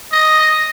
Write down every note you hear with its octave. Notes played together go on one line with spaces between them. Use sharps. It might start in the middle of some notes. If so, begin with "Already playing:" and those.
D#5